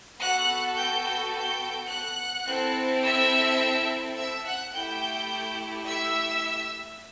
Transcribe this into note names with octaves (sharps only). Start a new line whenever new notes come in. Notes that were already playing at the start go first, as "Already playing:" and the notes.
B3 F#4 A4 F#5 F#6
G5 G6
G5 G6
G5 G6
F#5 F#6
C4 E4 A4
E5 E6
E5 E6
F#5 F#6
A3 E4 G4 G5 G6
E5 E6